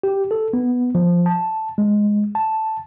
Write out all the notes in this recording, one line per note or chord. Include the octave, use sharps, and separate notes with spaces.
G4
A4
B3
F3
A5
G#3
A5